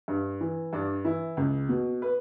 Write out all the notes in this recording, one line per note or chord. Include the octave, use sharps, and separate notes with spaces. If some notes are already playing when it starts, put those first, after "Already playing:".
G2
E3
G2 D4
E3 E4
C#2
B2
B4